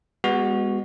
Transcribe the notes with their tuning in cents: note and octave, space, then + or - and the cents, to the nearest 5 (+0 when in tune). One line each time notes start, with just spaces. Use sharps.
G#3 -35 B3 +0 F#4 +0